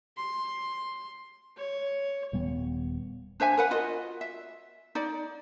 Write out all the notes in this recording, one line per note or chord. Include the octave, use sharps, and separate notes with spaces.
C6
C#5
D#1 G3 B3
D4 C5 E5 G#5
A#4 B4 F#5
F4 F#4 D#5
E5
D#4 D5